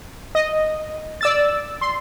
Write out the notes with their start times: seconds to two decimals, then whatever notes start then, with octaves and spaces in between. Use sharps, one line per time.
0.35 D#5
1.21 D5 E6 A6
1.81 C6